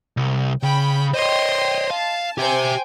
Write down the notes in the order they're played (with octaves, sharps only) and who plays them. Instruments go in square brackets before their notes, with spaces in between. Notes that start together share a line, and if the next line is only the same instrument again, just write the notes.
[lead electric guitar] C2
[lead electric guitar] C#3 [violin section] G5 B5
[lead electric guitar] C5 C#5 [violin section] D#5 G5 C6
[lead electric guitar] F5 [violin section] A5
[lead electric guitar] G4 E5 [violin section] C5 G5 G#5